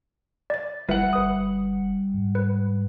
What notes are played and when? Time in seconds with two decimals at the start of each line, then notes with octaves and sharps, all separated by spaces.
0.50 D5 A6
0.89 G1 G3 E4 B4 E5 F#5
1.13 G1 B4 D#6
2.14 G#2
2.35 B4